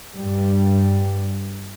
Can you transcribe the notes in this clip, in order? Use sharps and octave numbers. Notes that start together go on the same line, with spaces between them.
G2 G3